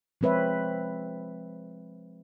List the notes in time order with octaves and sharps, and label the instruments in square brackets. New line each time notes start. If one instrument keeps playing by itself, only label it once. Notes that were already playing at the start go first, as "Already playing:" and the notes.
[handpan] F3 G#3 C4 B4 C#5 E5